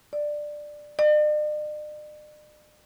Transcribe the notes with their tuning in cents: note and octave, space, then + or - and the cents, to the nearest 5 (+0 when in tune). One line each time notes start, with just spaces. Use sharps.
D5 +10
D5 +45